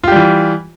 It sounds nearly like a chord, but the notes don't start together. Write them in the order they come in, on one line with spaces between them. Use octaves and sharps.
F4 G4 G3 E3